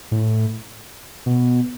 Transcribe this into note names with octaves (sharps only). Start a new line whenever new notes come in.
A2
B2